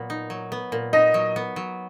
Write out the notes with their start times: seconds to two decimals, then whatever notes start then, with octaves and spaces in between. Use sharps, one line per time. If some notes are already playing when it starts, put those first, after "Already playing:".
Already playing: A#2 F#3 B3
0.10 D#4
0.30 F#3
0.52 B3
0.72 A#2
0.93 D#4 D#5
1.14 F#3
1.36 B3
1.56 F#3